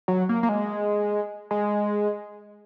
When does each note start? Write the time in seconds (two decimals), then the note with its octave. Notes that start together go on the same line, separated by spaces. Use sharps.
0.08 F#3
0.29 A#3
0.43 A#3
0.49 G#3
1.51 G#3